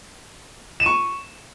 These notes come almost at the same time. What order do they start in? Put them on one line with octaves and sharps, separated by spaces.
E7 D#7 C#6